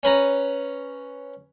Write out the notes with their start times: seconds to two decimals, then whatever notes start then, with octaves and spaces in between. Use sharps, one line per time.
0.03 C#4 B4 A#5